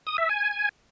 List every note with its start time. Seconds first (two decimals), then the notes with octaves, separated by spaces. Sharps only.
0.07 D#6
0.18 E5
0.29 G#5